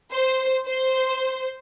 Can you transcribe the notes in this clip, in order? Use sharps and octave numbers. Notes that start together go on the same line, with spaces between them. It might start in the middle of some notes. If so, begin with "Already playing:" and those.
C5
C5